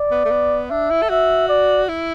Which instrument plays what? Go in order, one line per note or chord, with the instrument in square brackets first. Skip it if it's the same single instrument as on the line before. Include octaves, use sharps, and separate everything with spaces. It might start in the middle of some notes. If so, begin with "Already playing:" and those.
Already playing: [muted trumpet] D5
[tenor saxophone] B3
A3
B3
[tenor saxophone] D4 [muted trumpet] E5
[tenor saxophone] E4
A4
[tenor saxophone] F#4 [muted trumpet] E5
[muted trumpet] D5
[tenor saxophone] E4